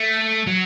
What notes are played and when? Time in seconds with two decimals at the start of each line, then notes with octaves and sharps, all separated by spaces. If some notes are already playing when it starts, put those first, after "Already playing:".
Already playing: A3
0.47 F#3